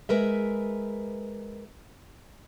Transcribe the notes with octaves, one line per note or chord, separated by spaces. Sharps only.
G#3 A#4 B4 E5